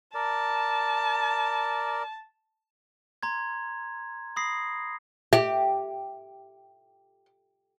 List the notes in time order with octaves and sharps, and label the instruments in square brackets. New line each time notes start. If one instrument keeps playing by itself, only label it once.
[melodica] A#4 D5 [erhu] A5
[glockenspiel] A#5 C6 G#6
B5 D#6 A#6 C7
[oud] G4 [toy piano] E5